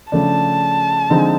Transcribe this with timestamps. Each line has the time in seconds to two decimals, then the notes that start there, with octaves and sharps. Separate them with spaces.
0.12 C#3 F3 A3 D4 A5
1.10 D3 F3 G#3 C4 D#4